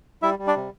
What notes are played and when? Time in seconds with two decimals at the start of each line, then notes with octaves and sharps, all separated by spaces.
0.22 G3 E4 E5
0.39 G3
0.47 D4 D5
0.56 C3